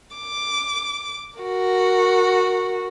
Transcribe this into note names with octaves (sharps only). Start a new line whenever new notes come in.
D6
F#4 A#4